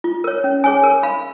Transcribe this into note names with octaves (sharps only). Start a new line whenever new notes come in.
F4
A#4 C#5
C#4
G#4 C#5 G#5
A#4
F5 B5